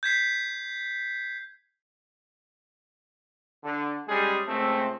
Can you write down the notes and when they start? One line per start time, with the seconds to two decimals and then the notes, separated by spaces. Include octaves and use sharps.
0.03 G6 G#6 B6 C7
3.64 D3
4.08 G3 G#3 C#4 G#4
4.46 C#2 A3 C4